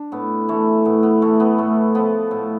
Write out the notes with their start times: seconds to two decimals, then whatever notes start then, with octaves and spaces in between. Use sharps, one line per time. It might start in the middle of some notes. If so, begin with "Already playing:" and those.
Already playing: D4
0.12 A2 B3
0.48 E3 A3
0.85 A2 B3
1.03 B3
1.22 E3 A3
1.40 B3
1.58 A2 A3
1.95 F3 B3
2.31 A2